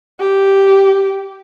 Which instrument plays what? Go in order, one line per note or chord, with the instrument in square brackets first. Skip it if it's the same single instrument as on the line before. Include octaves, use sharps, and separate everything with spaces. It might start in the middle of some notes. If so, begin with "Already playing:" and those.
[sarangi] G4